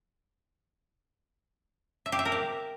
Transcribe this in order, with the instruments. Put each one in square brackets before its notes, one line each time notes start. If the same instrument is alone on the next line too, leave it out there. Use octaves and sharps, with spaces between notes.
[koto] E5
G4
E5
A#4
G4